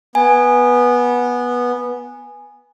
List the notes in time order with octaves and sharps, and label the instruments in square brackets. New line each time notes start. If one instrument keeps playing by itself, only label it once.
[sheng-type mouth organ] B3 [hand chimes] G#5